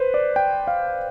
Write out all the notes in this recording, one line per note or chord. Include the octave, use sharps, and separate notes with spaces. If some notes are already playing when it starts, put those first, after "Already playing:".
Already playing: B4 C5
D5
G5
F5